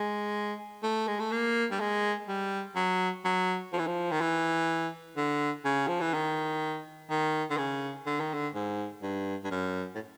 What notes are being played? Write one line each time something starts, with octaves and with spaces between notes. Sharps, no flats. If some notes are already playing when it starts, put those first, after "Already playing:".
Already playing: G#3
A3
G#3
A3
A#3
G3
G#3
G3
F#3
F#3
F3
E3
F3
D#3
E3
D3
C#3
F3
E3
D#3
D#3
D3
C#3
D3
D#3
D3
G#2
G2
G2
F#2
A2